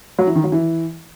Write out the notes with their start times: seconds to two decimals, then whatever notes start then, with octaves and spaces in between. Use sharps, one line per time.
0.19 F#3
0.27 E3
0.35 D#3
0.44 F#3
0.52 E3